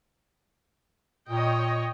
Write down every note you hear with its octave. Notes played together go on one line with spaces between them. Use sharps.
A#2 C#5 D#5 G5